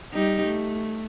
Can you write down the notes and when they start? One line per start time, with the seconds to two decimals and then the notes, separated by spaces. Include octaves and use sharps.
0.13 G3 D#4 G4
0.45 A3